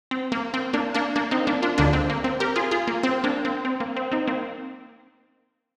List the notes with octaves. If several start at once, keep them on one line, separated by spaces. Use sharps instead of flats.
C4
A#3
C4
A#3 D4
A#3 D4
A#3 D4
C4 D#4
A#3 D4
D4 F4
D2 D3 G#3 A#3 D4
C4
A#3
C4
G4 A#4
F4 G#4
F4 G#4
A#3
C4
A#3 D4
C4
C4
A#3
C4
C4 D#4
A#3 C4